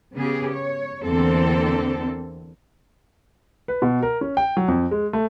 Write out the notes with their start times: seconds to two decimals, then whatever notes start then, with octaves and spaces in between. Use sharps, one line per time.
0.15 C#3 B3 G4 G#4
0.53 C#5
1.05 E2 D3 E3 A#3 C4 A4
3.68 B4
3.82 B2
4.03 A#4
4.21 C#4
4.37 G5
4.57 F#3
4.68 F2
4.91 G#3
5.13 A3